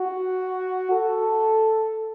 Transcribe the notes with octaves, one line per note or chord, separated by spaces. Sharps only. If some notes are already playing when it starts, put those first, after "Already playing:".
Already playing: F#4
A4